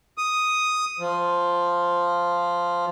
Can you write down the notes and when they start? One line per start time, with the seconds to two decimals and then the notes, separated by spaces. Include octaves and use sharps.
0.18 D#6
0.99 F3